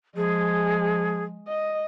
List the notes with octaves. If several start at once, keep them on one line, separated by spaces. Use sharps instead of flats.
F3 G#3 G#4
D#5